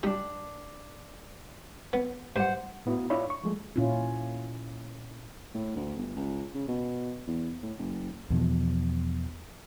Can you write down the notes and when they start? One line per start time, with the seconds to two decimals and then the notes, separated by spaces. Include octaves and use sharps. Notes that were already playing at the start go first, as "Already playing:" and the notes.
0.03 G3 D4 D#4
1.93 B3
2.36 G2 C5 F#5
2.86 A2 B3 E4 F#4
3.10 D4 E4 F4 C#5 D5 B5
3.30 C#6
3.44 F3 G#3 A3
3.76 A#2 C#4 E4 F4
5.55 A2
5.76 D2
5.97 G1
6.17 C#2
6.54 C#3
6.68 B2
7.28 E2
7.63 A2
7.79 F#1
8.30 E2 B2 F3